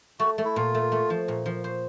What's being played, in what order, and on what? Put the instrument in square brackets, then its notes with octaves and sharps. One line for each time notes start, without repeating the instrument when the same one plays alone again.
[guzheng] A3 [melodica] F#4
[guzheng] A3
[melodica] E4
[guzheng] A#2 [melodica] F4
[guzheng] A3
A3
F3
A#2
F3
C5